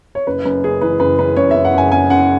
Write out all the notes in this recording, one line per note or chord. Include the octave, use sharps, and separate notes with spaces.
C#5
F#1 B4
F#2 B4
F#1 G#4
E3 B4
F#1 B4
F#2 B4
F#2 C#5
F#1 E5
F#5
F#1 G#5
F#1 G#5
F#1 F#5